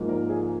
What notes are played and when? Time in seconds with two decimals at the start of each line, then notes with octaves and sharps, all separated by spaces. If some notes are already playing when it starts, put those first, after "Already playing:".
Already playing: G#2 F3 A#3
0.09 A#4
0.29 G#4